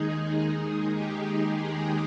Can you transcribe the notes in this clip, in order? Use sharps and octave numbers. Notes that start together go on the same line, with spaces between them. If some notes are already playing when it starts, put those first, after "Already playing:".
Already playing: D#2 D#3 G#3 D#4 G#4
G4
G#3 G#4